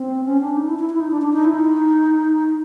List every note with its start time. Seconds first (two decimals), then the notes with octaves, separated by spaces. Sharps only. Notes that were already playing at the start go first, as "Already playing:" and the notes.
Already playing: C4
0.25 C#4
0.41 D4
0.57 D#4
0.68 E4
0.79 E4
0.90 E4
1.00 D#4
1.11 D4
1.22 D4
1.33 D#4
1.45 E4
1.54 D#4